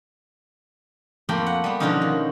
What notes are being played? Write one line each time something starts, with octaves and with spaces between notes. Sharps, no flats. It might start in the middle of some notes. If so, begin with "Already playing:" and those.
F2 A3 A#3 G5 B5 C6
F#5
G3 B3
B2 D3 F3 G#3 C#4 D#4
D#3